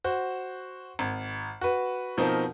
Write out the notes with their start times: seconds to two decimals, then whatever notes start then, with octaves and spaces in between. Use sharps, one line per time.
0.04 F#4 C5
0.99 G#1
1.61 F#4 B4
2.17 B2 F3 C4 D#4 A#4